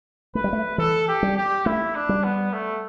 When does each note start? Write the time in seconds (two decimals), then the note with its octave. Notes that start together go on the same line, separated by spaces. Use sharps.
0.35 A3 B4
0.44 G3
0.53 A3
0.78 E3 A4
1.08 G4
1.23 G3
1.37 G4
1.66 A3 E4
1.95 D4
2.09 G3
2.24 B3
2.53 A3